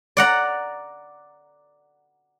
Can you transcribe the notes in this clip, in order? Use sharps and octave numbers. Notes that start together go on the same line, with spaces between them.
D5 F#5 A#5